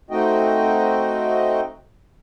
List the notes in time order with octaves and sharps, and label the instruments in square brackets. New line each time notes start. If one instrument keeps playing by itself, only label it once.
[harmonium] A3 C4 D#4 F#4 D#5 G5